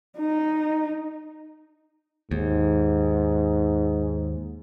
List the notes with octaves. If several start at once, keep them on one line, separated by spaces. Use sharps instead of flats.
D#4
D#2 G#2